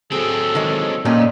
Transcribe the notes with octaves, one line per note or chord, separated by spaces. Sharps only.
F#3 C4 G#4 A4
D#3 E3 G#3
A#2 G3 C#4 D#4